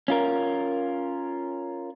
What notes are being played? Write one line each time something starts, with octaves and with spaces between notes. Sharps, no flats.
C#4 F4 A#4